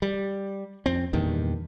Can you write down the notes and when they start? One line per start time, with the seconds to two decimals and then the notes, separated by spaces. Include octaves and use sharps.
0.02 G3
0.86 F2 C4
1.13 E2 G2 A#2 D#3